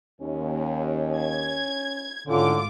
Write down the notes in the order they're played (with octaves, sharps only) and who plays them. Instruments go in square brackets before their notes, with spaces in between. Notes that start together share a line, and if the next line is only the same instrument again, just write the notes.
[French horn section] D#2 [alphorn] C#4
[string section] G#6
[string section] G#1 F4 D6 [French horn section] A2 [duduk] D3 [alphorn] C#4